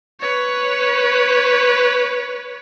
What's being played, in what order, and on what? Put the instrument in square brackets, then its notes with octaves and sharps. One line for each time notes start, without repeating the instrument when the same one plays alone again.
[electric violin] B4 C#5